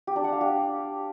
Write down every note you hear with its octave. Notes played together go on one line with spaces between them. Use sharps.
G4
D4
F#5
F5
G4